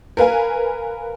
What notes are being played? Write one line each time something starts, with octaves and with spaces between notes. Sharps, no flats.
A#4 B4 F5 G#5